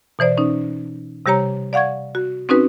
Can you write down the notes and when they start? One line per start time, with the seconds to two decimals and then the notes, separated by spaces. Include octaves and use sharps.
0.19 B2 E3 C5 D5
0.37 C#4 D#4
1.26 C3 G3 G4 C#5 A#5
1.73 D5 F5 F#5 C#6 G#6
2.15 F#4
2.49 C4 C#4 D#4 F#4 B4